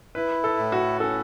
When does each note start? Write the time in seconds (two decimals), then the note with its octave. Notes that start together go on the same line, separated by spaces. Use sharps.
0.15 E4 B4
0.44 A4
0.58 A2
0.72 F#4
1.00 C#4 A4